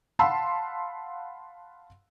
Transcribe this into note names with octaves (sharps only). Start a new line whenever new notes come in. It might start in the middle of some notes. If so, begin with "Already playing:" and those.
F5 F#5 A5 B5 C6 E6